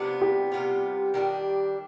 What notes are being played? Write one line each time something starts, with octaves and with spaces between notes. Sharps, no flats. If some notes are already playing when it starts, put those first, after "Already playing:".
Already playing: C3 F3 B3 D4
G4
C3 G3 B3 F4
D#3 G3 D4